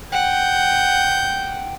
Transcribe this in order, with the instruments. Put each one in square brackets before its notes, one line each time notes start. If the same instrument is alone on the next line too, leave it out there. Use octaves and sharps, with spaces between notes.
[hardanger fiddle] F#5 [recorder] G5 [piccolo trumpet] G6